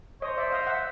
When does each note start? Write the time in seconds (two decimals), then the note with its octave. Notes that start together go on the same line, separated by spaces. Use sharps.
0.22 C5 C#5 D#5
0.37 D5 E5
0.52 D#5 F5
0.67 E5 F#5